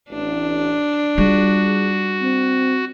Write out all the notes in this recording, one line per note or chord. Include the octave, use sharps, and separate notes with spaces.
A1 D4
G3 F4 F#4 G#4
C4